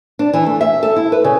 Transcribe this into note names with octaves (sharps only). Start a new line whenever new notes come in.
D4
E3
A3
E5
A4
E4
B4
C#3